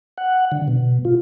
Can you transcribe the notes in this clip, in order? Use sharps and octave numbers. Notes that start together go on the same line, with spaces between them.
F#5
D3
B2
F4